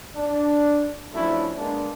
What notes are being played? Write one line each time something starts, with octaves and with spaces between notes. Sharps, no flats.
D4
F3 F#3 A3 C#4 D4 E4
G#3 A#3 B3 D4